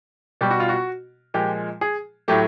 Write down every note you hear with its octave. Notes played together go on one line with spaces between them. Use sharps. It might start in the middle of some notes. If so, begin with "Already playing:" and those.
B2 G3 G4
F#4
F4
F#4
A#2 F3 G#3 G4
G#4
A2 F#3 A3 G4